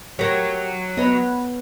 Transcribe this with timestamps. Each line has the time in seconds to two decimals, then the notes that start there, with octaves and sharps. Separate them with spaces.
0.19 F#3 G4 A#4 C#5
0.97 B3 B4 C#5 D#5